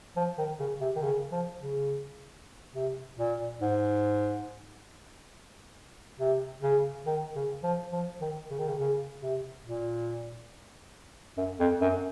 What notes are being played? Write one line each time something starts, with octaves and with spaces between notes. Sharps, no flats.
F3
D#3
C#3
C3
D#3
C#3
F3
C#3
C3
A#2
G#2
C3
C#3
D#3
C#3
F3
F3
D#3
C#3
D#3
C#3
C#3
C3
A#2
F#2
F2
F#2